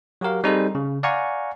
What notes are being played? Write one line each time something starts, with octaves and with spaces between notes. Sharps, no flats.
F#3 F#4 G4 A#4 F5
G3 C4 D#4 G#4 A4 C5
C#3
D5 F5 F#5 G#5 A#5 C#6